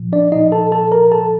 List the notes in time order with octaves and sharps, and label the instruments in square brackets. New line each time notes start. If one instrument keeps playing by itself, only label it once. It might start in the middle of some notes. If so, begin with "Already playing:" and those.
Already playing: [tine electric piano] A#2 F3
D4 D5
A#2 F3 D#4 D#5
A4 A5
A4 A5
A#4 A#5
A4 A5